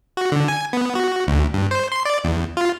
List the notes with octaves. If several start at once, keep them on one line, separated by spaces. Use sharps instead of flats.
F#4
D3
G#5
B3
F#4
D2
G2
C5
C6
D5
E2
F4